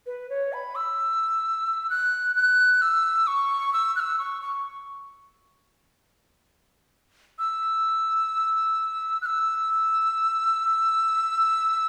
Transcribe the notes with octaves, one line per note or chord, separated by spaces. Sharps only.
B4
C#5
B5
E6
F#6
F#6
E6
C#6
E6
F#6
E6
C#6
C#6
E6
F#6
E6